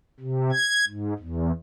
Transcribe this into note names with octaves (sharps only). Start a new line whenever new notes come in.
C3
G#6
G#2
E2